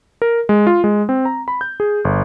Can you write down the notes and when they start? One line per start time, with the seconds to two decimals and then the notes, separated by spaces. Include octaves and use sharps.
0.22 A#4
0.49 G#3
0.67 F4
0.84 G#3
1.09 C4
1.25 A#5
1.48 B5
1.61 G6
1.80 G#4
2.05 G1